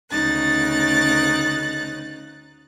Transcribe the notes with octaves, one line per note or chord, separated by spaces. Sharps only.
D2 C#3 D#4 F#6 A6